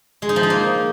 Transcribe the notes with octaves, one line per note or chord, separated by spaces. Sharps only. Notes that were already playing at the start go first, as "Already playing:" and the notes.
G#3
D#4
F3
D#4
A#3